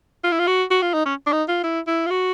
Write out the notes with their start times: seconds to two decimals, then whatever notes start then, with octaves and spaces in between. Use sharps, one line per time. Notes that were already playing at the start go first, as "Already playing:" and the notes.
0.24 F4
0.32 E4
0.39 F4
0.47 F#4
0.71 F#4
0.82 F4
0.94 D#4
1.06 C#4
1.26 D4
1.32 D#4
1.48 F4
1.64 E4
1.87 E4
2.06 F4
2.11 F#4